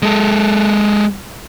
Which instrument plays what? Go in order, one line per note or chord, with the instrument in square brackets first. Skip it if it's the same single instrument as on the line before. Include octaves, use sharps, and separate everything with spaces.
[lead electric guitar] G#3 A4